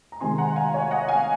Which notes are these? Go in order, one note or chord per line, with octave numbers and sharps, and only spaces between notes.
A#5
C3 D#3 G#3 G#5 C6
F#5 A#5
F5 G#5
C#5 F5
D#5 F#5
F5 G#5